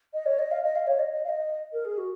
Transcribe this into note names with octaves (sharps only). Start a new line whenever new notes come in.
D#5
C#5
D#5
F5
D#5
F5
C#5
D#5
D#5
F5
D#5
A#4
G#4
F#4